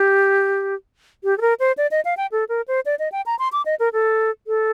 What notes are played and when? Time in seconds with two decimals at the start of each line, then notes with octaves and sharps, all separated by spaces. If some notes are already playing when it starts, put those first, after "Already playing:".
Already playing: G4
1.24 G4
1.38 A4
1.41 A#4
1.60 C5
1.77 D5
1.91 D#5
2.05 F5
2.17 G5
2.32 A4
2.49 A#4
2.68 C5
2.86 D5
2.99 D#5
3.12 G5
3.26 A#5
3.39 C6
3.52 D6
3.66 D#5
3.79 A#4
3.93 A4
4.47 A4